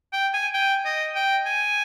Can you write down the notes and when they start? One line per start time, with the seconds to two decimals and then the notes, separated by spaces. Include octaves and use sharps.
0.13 G5
0.34 G#5
0.54 G5
0.85 D#5
1.15 G5
1.46 G#5